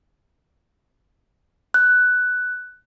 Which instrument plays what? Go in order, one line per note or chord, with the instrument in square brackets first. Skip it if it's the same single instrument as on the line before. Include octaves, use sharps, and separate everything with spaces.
[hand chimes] F#6